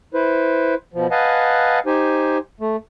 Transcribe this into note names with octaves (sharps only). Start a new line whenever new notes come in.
E4 B4 C5
B2 F3
B4 D#5 F5 F#5 G#5 A5
D#4 G4 C5 G#5
A3